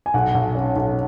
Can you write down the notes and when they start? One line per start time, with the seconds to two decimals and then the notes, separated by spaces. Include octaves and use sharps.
0.06 G#5
0.14 B1 F#5
0.35 B1
0.55 C#4
0.76 B1